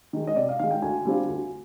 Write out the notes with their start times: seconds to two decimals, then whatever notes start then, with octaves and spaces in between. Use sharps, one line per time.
0.13 D#3 G#3
0.27 D#5
0.36 C3 D5
0.49 F5
0.59 D#3 G#3 F5
0.71 G5
0.82 D2 G#5
1.05 D3 G3 C4 F4
1.28 D2